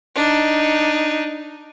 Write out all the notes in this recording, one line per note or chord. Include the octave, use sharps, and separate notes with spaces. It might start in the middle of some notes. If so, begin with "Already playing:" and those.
D4 D#4